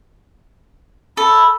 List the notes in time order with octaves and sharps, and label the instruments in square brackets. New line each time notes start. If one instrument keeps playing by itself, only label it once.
[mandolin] A4 [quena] B5